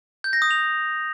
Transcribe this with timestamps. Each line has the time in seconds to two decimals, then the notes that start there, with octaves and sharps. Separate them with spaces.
0.24 G6
0.33 A#6
0.42 D#6
0.51 F7